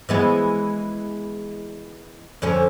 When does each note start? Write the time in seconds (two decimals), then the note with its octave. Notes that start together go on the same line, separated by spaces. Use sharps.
0.09 E3 G#3 B3
2.42 F2 D3 C#4